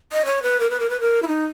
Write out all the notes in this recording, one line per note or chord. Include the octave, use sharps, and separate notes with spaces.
D#5
C#5
B4
A#4
B4
A#4
B4
A#4
E4
D#4